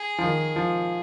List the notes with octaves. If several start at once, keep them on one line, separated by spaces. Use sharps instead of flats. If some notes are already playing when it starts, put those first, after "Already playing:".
Already playing: G#4
F3
D#3
F3